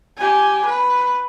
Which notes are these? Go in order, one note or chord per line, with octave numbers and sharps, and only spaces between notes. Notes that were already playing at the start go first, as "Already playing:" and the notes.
G4 G#5
B4